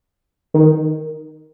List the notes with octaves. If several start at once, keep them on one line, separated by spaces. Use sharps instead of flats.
D#3